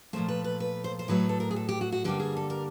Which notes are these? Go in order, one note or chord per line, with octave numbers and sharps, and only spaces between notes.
A#2 F3 A3 C5
B4
B4
B4
C5
C5
A2 F#3 A3 B4
A4
A#4
G#4
A4
G4
F#4
F#4
G2 D3 G3 A#3 G4
G#4
A4
A#4